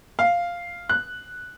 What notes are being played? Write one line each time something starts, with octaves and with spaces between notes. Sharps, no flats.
F5
F#6